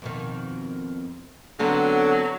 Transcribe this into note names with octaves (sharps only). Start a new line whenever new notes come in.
F2 B2 D#3
D3 F#3 B3 C4 D4